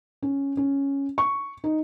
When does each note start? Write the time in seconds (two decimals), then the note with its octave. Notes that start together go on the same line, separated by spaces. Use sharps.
0.23 C#4
0.57 C#4
1.18 C#6
1.64 D#4